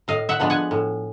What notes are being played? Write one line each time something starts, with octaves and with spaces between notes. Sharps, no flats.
A2 D#5 F5
E5 F#5
F3 G#3 B3 D4
F#5 G#5
A2